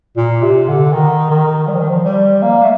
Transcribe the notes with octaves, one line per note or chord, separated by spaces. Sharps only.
A#2
C3
D3
D#3
D#3
G3
F3
D#3
F3
G3
A#3
A3